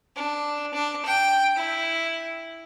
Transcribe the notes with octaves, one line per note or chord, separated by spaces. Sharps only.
D4
D4
G5
E4